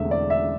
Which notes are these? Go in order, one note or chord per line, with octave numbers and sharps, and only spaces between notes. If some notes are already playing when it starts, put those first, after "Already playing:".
Already playing: E1 E2 D3 A3 C4 E5
D5
E5